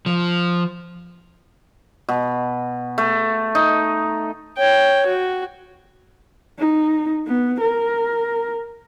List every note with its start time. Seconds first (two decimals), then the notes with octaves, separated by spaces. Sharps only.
0.06 F3
2.09 B2
2.98 A3
3.55 D#4
4.58 C#5 G5
5.06 F#4
6.59 D#4
7.27 B3
7.61 A#4